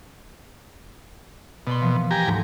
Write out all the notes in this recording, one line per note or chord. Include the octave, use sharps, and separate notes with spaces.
B2 D5 B5 C6
E3 F3 A#3
G4 G#5 A#5
D2 G#2 G3